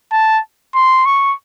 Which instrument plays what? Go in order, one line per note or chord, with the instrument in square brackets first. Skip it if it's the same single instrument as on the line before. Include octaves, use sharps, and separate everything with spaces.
[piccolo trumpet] A5
C6
C#6